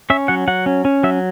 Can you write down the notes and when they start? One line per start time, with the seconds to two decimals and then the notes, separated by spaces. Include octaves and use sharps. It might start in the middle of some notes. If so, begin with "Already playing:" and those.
0.10 C#4 E5
0.28 F#3 F#5
0.48 F#3 F#5
0.66 C#4
0.85 C#4
1.03 F#3 E5